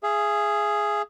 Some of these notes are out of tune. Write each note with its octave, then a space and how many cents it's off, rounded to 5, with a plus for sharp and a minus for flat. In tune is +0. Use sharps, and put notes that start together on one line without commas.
G#4 +0 E5 +45